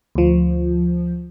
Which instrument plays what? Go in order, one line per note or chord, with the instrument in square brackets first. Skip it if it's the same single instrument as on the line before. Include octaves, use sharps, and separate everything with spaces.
[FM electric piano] D2 F3